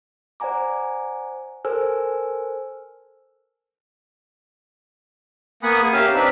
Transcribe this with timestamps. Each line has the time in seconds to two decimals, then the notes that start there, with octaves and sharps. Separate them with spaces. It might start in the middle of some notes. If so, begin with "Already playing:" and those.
0.40 C5 D5 F#5 G#5 A#5 D6
1.65 A4 A#4 C5 G#5 E6 F6
5.63 A#3 B3 F#5 G#5 B5 D#6
5.82 A#3 G#4
5.93 C#4 G4 A#4 E5 F5
6.14 C4 D4 D#4 B4 B5